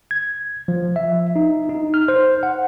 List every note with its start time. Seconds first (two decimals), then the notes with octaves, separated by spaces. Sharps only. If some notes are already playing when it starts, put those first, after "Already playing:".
0.11 G#6
0.68 F3
0.96 E5
1.36 D#4
1.69 D#4
1.94 F6
2.08 C5
2.43 F#5